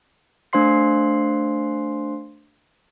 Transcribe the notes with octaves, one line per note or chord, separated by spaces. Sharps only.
A3 D4 C5 F5 C6 C7